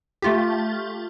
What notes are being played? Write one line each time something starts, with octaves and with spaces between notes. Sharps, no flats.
A3 F4 G4